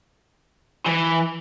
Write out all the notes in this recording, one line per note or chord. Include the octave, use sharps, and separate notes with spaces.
E3